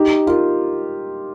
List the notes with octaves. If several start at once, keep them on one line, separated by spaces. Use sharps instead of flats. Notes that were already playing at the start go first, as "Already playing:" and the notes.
Already playing: D#4 G4
F4 A#4